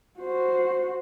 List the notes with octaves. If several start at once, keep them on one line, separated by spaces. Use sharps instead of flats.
F#4 C5